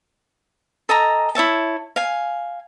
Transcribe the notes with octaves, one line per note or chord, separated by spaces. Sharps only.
A4 D#5 G#5 A#5
E4 C#5 E5 A5
F5 G#5